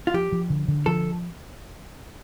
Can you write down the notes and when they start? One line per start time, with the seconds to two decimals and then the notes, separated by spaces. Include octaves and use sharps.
0.07 F4
0.14 F3 G4
0.32 F3
0.50 D3
0.68 D3
0.86 F3 A4